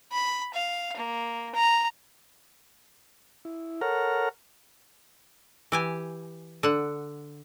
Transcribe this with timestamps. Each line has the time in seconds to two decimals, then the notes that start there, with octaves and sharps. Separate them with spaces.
0.12 B5
0.54 F5
0.97 A#3
1.55 A#5
3.45 E4
3.81 A4 A#4 C#5 F#5 A#5 F6
5.72 E3 G4 G#5
6.63 D3 F#5